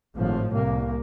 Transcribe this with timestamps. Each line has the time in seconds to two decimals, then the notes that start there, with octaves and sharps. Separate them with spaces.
0.16 G#1 A2 F3
0.52 C2 A#3